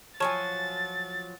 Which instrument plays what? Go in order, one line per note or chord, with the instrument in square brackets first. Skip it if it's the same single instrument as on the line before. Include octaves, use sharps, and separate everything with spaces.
[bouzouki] F3 F#3 G#5 [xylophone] C#5 A5 C#6 [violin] A6